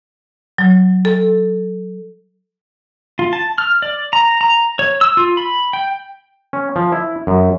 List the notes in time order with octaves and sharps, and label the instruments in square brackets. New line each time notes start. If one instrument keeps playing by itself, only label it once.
[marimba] F#3
A4
[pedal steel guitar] F4
A5
F6
D5
A#5
A#5
C#5
E6
F4
B5
G5
[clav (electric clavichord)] C#4
F3
E4
F#2